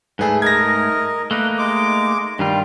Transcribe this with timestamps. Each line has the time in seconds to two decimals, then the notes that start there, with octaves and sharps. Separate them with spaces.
0.19 G#2 A3 G#4 B4
0.42 A#4 D#5 G#6 A#6
1.31 A3 A#3 D#4 B4
1.58 G#3 D6
2.39 G2 D#3 G3 F4